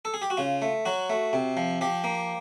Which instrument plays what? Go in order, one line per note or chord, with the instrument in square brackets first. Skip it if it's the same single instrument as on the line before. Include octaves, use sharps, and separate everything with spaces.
[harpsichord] A4
G#4
G4
F#4
C#3 F4
A3
F#3 F#4
A3
C3
F3
F3 G4
A#3